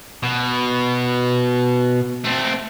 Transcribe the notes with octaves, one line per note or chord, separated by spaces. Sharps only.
B2
A3 C4